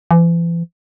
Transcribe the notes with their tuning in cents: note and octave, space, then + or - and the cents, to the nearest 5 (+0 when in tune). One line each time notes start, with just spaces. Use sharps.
E3 +40